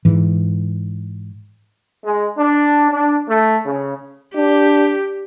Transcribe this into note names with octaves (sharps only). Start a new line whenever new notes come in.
G#2 E3
G#3
D4
D4
A3
C#3
D4 G4